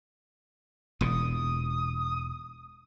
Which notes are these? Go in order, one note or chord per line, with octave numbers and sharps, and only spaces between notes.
E1 E2 A#2 D#6